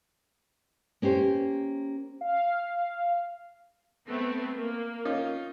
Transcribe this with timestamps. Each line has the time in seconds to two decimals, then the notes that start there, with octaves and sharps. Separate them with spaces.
1.02 A#3 C#4 G4 C5
2.21 F5
4.07 A3 B3 C4
4.56 A#3
5.05 C#4 D#4 F4